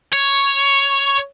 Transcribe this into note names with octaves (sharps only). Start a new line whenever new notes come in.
C#5